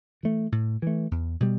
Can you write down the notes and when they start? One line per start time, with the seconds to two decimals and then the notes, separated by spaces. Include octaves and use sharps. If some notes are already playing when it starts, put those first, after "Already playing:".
0.23 E3 A3
0.52 A2
0.82 E3 A3
1.11 E2
1.40 B2 G3